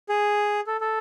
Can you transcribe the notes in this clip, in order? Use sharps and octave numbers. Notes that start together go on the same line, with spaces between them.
G#4
A4
A4